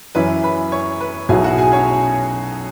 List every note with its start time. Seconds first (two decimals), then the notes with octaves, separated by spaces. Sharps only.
0.15 F#2 E3 C#4 E4 B4
0.43 B4 B5
0.72 C#5 C#6
1.01 B4 B5
1.29 B1 B2 F#3 E4 G#4 G#5
1.44 F#4 F#5
1.58 G#4 G#5
1.72 C#4 C#5